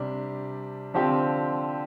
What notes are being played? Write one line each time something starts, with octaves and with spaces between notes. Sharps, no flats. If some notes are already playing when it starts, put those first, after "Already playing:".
Already playing: C3 G3 D4
D3 F3 C4 G4